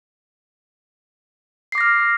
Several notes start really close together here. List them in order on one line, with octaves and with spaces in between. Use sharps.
C7 D6 A#6 F6